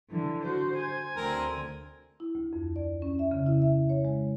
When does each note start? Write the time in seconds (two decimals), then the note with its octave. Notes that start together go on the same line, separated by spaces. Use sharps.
0.10 D3 E3
0.45 F#4 C5
0.76 G#5
1.16 D2 D3 C4 A#4
2.20 E4
2.35 D2
2.53 F2
2.76 D5
3.02 C#4
3.19 E5
3.31 C#3
3.46 E4
3.62 E5
3.90 C#5
4.05 G#3